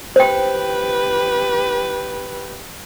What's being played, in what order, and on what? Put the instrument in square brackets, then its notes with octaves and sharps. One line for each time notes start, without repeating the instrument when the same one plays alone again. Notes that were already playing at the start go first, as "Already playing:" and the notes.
[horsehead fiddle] G4 B4 [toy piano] C5 G5